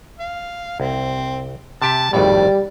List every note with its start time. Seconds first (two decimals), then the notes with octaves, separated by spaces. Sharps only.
0.19 F5
0.80 C2 C4
1.82 C3 G4 E5 A5
2.13 G#1 F2 A2 G3 D5